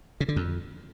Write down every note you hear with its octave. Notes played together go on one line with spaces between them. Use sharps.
C#3
D3
F2